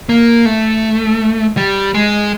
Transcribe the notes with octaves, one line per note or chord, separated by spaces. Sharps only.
A#3
A3
G3
G#3